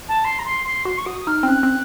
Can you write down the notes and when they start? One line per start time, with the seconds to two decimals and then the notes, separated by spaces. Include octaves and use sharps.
0.08 A5
0.24 C6
0.39 A#5
0.45 C6
0.64 C6
0.85 F#4 C6
0.98 C#6
1.06 F#4 D#6
1.21 D#6
1.27 D#4 F6
1.43 C4
1.47 C#4 F#6
1.63 C4